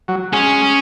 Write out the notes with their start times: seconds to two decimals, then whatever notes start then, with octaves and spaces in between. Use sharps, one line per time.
0.08 F#3
0.33 G#3 C#4